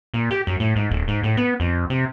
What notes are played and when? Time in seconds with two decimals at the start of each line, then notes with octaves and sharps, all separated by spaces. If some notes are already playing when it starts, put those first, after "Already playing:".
0.14 A#2
0.31 G4
0.47 F#2
0.60 A2
0.76 G#2
0.91 D1
1.08 G#2
1.23 A2
1.37 B3
1.60 F2
1.90 C3